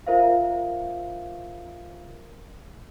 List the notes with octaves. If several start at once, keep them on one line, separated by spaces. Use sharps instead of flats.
F4 A#4 C5 E5 F5